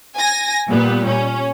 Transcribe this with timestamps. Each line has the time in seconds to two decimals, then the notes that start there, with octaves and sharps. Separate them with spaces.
0.18 G#5 A#6
0.70 A#2 G3 B3
1.08 C#4